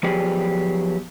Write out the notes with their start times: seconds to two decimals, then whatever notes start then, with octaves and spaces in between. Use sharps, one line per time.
0.03 F3 F#3 B3 G4 G#4 D5